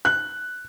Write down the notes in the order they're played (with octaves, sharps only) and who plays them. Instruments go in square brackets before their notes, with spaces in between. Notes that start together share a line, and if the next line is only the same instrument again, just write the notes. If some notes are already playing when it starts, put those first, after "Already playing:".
[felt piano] F#6